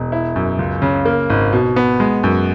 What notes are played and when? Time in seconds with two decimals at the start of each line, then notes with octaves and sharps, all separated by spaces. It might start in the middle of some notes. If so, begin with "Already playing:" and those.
Already playing: E1
0.12 E4
0.36 F#2
0.59 C#2
0.82 C#3
1.05 A#3
1.30 G#1
1.53 B2
1.76 B3
2.00 G#3
2.23 F#2